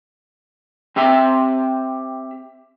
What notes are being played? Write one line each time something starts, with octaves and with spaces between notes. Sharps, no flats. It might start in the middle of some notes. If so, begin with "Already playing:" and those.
C4 G4 E5 G5